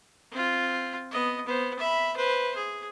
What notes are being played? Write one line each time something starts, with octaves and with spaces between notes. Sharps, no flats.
C4 F4
B3 D#5
B3 C5
E5 B5
B4 C5
G#4